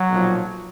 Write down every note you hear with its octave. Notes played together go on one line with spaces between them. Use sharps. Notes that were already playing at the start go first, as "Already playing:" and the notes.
Already playing: F#3
B1 A#2 F3